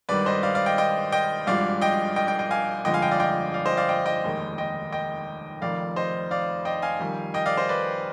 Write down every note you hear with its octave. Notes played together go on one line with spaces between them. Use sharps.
G#1 G2 D#3 G3 B4 D5
C5 D#5
D5 F5
D5 F5
D#5 G5
D#5 G5
D#5 G5
G#1 G2 F3 G#3 D5 F5
D#5 G5
D#5 G5
D#5 G5
D#5 G5
F5 G#5
G1 F2 D3 F3 G#3 D#5 G5
F5 G#5
D#5 G5
D5 F5
D#5 G5
D5 F5
C5 D#5
D5 F5
D#5 G5
D#5 G5
F1 D#2 D#3 G#3
D#5 G5
D#5 G5
F1 F2 D#3 D5 F5
C5 D#5
D5 F5
D#5 G5
F5 G#5
F2 D#3 G3
D#5 G5
D5 F5
C5 D#5
B4 D5